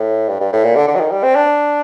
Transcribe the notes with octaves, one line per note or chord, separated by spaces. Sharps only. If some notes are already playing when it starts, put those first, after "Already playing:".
Already playing: A2
G2
G2
A2
A#2
D3
D3
F#3
D#3
G3
C4
D4